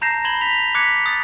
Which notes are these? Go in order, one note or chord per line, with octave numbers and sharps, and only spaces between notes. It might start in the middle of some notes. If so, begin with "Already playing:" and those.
A5 A#5 G6 A#6 C7 E7
B5 G#6 E7 F#7 G7
B6 F7
D6 F#6 G#6 B6 C#7
D#6 A6